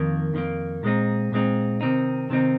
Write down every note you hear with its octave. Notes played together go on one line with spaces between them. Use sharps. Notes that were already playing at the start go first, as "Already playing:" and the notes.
Already playing: F2 D#3 A#3
F2 D#3 A#3
A#2 G#3 C4 D#4
A#2 G#3 C4 D#4
C3 D#3 C4 D#4
C3 D#3 C4 D#4